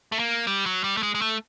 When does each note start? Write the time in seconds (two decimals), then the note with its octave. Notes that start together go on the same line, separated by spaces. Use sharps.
0.12 A3
0.19 A#3
0.47 G3
0.66 F#3
0.84 G3
0.97 A3
1.03 G#3
1.15 G#3
1.21 A3